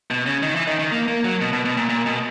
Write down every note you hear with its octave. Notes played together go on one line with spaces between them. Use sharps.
B2
C#3
D#3
E3
D#3
D#3
A#3
A#3
F#3
B2
B2
B2
A#2
A#2
B2